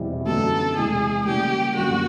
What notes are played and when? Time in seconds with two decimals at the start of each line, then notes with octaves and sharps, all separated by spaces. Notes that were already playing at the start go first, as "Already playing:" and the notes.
Already playing: E2 B2 G3 C4 E4
0.26 F#2 D3 F#3 B3 A4
0.76 E2 C3 E3 G#3 G#4
1.25 C#3 E3 G3 A#3 G4
1.75 F#2 D3 G3 A#3 F#4